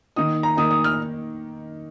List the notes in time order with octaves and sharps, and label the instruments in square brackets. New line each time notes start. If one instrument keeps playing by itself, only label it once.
[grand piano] D#3 A#3 D#4 [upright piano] D#6
[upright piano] A#5
[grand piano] D#3 A#3 D#4 [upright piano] D#6
[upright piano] D#6
F6